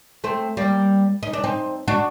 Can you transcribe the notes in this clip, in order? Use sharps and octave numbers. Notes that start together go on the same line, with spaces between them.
A3 C4
G3 A#3
D#4
D4
C4 D#4
D4 F#4